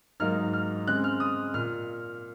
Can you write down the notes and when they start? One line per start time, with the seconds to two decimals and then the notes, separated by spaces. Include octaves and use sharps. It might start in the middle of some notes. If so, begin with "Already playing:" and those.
0.20 G#2 F#3 A#3 D#4 F6
0.53 F6
0.87 C#3 G#3 C4 F#6
1.04 F6
1.20 D#6
1.54 A#2 F6